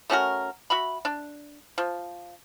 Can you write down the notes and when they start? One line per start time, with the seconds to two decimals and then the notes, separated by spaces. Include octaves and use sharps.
0.10 A3 C#4 F#4 A#4
0.70 F#4 E5 B5
1.05 D4
1.78 F3